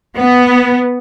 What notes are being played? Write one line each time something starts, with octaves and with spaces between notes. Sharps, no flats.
B3